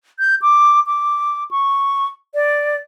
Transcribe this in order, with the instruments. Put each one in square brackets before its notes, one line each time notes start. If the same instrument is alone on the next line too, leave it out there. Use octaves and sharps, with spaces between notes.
[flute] G6
D6
D6
C#6
D5